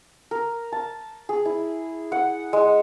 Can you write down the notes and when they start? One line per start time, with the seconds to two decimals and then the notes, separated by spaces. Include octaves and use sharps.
0.31 A#4
0.72 A5
1.29 G#4
1.45 E4
2.12 F#5
2.53 G#3